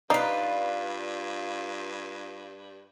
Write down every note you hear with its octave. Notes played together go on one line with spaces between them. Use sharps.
G2 D#4 F4 B4 D5